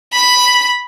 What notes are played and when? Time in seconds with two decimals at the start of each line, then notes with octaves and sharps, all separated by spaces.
0.13 B5